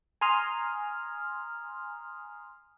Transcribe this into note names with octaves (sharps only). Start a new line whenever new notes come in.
G#5 A#5 C6 D#6 F6